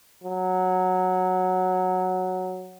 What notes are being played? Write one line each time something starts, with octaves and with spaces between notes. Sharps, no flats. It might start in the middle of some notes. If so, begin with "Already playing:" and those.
F#3